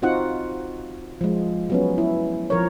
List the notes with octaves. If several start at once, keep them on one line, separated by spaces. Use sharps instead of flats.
C4 D#4 F4 F#4 F#5
F3 G#3
F#3 B3 C#4
E4
F3 A#4 C#5